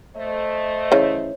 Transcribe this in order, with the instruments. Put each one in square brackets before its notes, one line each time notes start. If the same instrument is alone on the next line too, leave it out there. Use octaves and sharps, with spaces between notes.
[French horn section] A3 C5 D#5
[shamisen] C#3 E3 [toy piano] C#5